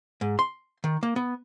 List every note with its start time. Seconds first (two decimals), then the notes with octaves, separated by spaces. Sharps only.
0.21 G#2
0.39 C6
0.84 D#3
1.03 A#3
1.16 B3